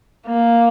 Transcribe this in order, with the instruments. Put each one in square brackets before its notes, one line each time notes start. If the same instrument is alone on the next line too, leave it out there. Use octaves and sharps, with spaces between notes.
[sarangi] A#3